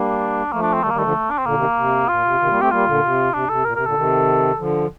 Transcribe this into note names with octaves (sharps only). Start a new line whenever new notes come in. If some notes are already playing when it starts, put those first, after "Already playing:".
Already playing: G3 A#3 D4
F3 A3 A#3
D4
C4
D#3 G3 A3
A#3
D#3 G3
A3
D3 F3
D4
C4
A#2 D3 A#3
C3 D#3
C3
A#2 F4
C3
C3 D#3
G3 A#3
A3 C4 G4
G3 A#3 F4
A#2 D3
C3
C3 D4
C3 A4
A#2 A#4
C3 A#4
A#2 D3 A4
C3 D#3
D3 F3